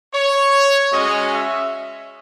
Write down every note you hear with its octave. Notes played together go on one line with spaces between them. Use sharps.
C#5
G#3 C#4 F#4 D#5
E5